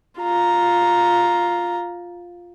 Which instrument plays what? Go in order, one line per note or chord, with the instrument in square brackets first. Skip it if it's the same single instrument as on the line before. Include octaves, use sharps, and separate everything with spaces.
[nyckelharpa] F4 A#5